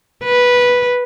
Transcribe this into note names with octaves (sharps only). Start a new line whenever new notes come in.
B4